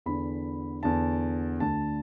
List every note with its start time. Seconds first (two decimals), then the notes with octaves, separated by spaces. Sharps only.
0.06 E2 D3 B5
0.83 E2 D3 A5
1.60 D2 D3 A5